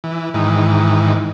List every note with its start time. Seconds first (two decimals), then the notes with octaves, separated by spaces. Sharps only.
0.04 E3
0.34 G#2 D#3 E3